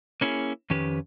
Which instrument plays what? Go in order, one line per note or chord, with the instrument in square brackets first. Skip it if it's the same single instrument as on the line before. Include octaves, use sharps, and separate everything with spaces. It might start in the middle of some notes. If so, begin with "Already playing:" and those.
[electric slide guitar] A#3 C#4 E4 G4 G#4
F2 D#3 C#4 G4 B4